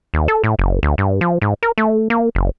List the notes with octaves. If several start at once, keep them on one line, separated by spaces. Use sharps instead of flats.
D#2
A4
A2
F#1
D2
G2
F3
G#2
A#4
A3
A#3
F#1